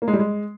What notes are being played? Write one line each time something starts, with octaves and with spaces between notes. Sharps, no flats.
A#3
G#3
G3
G#3